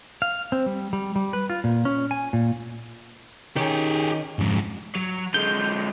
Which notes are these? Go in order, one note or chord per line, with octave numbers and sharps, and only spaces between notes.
F5
C4
G3
G3
G3
B4
F4
A#2
C#4
G#5
A#2
D#3 C#4 D#4 G4 G#4
F2 G#2
F#3
D3 G#3 G6